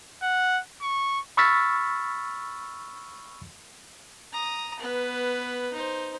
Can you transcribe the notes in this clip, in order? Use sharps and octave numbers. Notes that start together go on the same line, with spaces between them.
F#5
C#6
B5 C#6 E6 F6 A6 B6
A#5 D#6
B3 B4
D#4 C5